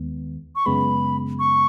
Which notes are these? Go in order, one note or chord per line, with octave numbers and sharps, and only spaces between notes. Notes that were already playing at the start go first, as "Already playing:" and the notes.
Already playing: D#2 D#3 G#3 B3
C#6
F#2 C#3 G#3 B3 B5
C#6